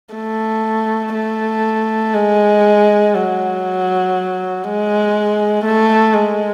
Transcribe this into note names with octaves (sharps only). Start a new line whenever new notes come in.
A3
A3
G#3
F#3
G#3
A3
G#3